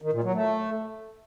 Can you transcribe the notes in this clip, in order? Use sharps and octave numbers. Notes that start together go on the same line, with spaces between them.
D#3
A#2
F#3
A3